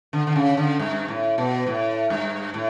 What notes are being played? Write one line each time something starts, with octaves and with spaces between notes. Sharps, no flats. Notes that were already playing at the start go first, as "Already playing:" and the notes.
D3
D3
C#3
D3
G2
A2
B2
A2
G2
A2